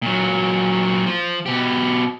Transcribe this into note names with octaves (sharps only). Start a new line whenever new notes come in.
A#2 F#3
F3
B2 G4